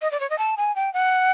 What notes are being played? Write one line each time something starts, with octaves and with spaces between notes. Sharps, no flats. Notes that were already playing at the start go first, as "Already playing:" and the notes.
D#5
D5
C#5
D#5
A5
G#5
G5
F#5